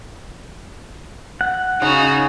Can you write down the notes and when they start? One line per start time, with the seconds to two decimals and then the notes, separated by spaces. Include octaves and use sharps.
1.41 F#5
1.82 C#3 D#4 F#4